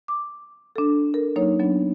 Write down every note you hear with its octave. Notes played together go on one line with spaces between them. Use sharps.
D6
D4 A4
A4 A#4
F#3 A#3 D#4 C#5
F#3 B3 D4